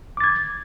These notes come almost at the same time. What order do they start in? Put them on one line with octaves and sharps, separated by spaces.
D6 A6 G#6